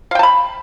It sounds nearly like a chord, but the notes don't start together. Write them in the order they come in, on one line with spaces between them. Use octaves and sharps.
F5 G5 A5 B5